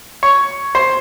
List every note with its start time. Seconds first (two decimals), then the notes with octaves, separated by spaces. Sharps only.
0.23 C#5
0.75 C5